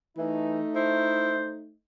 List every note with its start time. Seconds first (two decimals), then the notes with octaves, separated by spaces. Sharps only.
0.18 E3 A3 D#4
0.75 E4 C5